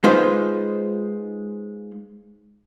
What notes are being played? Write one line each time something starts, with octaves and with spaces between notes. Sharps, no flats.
G#3 D#4 F4 B4 C5